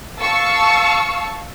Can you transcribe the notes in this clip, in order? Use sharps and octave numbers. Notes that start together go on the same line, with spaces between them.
F5 A5 C#6 E6